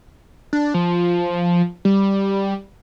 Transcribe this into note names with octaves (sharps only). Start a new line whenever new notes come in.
D4
F3
G3